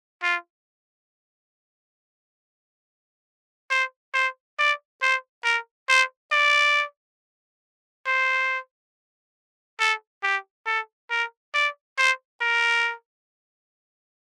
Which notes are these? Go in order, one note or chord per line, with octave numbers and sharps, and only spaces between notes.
F4
C5
C5
D5
C5
A#4
C5
D5
C5
A4
G4
A4
A#4
D5
C5
A#4